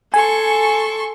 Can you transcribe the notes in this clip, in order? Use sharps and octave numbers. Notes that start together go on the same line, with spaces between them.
A4 G#5 C6 C#6